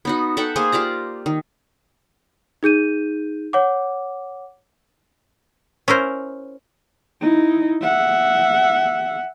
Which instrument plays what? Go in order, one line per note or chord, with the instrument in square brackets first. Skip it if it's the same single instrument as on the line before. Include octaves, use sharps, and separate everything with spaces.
[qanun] B3 D#4 F#4
A4 E5 F#5 G5
A#3 G#4 C5 G#5
F4 G4 D5 A#5
D#3
[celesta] D#4 G#4 G6 D#7
C#5 F#5 D6
[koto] C#4 E4 A#4 C5
[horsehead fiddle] D#4 E4
E5 F#5